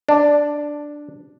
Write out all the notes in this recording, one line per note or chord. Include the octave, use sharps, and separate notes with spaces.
D4